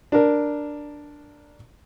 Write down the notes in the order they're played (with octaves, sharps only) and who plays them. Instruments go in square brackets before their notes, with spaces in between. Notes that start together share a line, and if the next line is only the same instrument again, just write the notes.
[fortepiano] D4 A#4